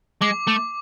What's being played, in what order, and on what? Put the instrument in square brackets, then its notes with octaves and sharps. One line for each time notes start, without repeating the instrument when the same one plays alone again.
[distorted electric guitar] G#3 [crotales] D6
[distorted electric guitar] A3